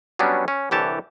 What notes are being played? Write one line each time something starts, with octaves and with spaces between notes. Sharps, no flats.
F#3 G3 B3 C#4 D4
C#4
C2 D3 E3 G4 C#5 A5